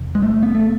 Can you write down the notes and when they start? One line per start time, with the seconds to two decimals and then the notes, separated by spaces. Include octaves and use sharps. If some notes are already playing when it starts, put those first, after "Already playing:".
Already playing: E2 C3
0.15 G#3
0.22 A3
0.43 B3
0.55 A3